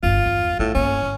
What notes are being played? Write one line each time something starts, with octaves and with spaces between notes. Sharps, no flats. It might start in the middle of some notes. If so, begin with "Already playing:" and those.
G1 G2 F4
E2
A2 A3 E4
G1 A#3 C#4
G#1